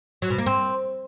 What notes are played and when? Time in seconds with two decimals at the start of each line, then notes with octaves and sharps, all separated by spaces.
0.22 F#3
0.30 B2
0.38 A#3
0.46 C4